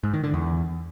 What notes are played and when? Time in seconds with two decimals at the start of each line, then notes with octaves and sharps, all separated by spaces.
0.04 G#2
0.14 D#3
0.24 D3
0.34 E2